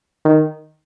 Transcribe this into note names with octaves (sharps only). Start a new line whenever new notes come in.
D#3